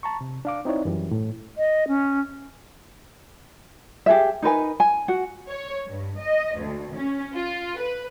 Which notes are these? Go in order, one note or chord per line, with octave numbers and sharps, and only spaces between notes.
A5 A#5 C#6
C3
D4 F5 D6
C4 D#4 E4 C#5 D5
F#2 E3 G3
A2
D#5
C#4
G4 G#4 E5
D#4 A#4 B4 G#5
G#5
F#4 F#5
C#5
G2
D#5
D2
C#4
F4
B4